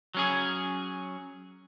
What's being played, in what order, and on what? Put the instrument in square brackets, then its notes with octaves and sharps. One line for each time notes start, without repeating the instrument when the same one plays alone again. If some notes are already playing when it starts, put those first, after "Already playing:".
[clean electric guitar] F#3 C#4 G#4